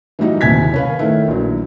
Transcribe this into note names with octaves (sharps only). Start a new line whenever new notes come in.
E3 F#3 G3 D#4 F#4
F#1 D#2 C3 G#5 G#6 B6
C#4 B4 F5
D#3 A3 E4
A#1 F#3